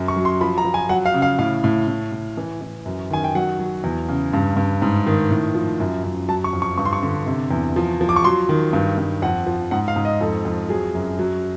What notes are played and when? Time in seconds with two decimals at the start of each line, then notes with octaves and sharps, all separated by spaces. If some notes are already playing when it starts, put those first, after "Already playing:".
Already playing: F#2
0.08 C#6
0.16 F#3
0.25 C6
0.41 F3 B5
0.58 A#5
0.65 F3
0.74 G#5
0.89 F#3 F#5
1.06 F5
1.14 C#3
1.22 F5
1.39 A2 F5
1.64 A2
1.88 A2
2.12 A2
2.37 E3
2.61 E3
2.86 F#2
3.10 D#3 G#5
3.24 G5
3.35 F#3 F#5
3.59 F#3
3.84 E2
4.08 C#3
4.33 G2
4.57 G2
4.82 G#2
5.07 D#3
5.30 A2
5.55 F3
5.80 F#2
6.04 F#2
6.28 F#3 A5
6.44 C#6
6.53 F2
6.62 C#6
6.78 G2 C#6
6.85 C6
6.93 C#6
7.03 D3
7.26 C3
7.51 E2
7.76 F3
8.01 F3
8.09 D6
8.16 C#6
8.24 F#3 C6
8.49 D#3
8.73 G2
8.98 G2
9.22 F2 F#5
9.47 F3
9.71 G#2 F#5
9.88 F5
9.96 G#2
10.05 D#5
10.21 F2 A4
10.45 F2
10.69 F#3 G#4
10.95 F#2
11.19 F#3